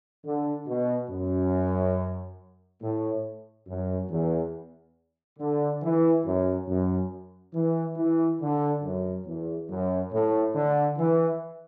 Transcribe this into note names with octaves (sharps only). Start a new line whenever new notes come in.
D3
B2
F#2
A2
F#2
E2
D3
E3
F#2
F#2
E3
E3
D3
F#2
E2
F#2
A2
D3
E3